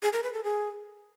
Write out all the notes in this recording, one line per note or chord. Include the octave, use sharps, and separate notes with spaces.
G#4
A#4
B4
A4
G#4